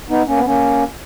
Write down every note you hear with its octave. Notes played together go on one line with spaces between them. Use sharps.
B3 D#4
A#3 C#4
B3
A#3 C#4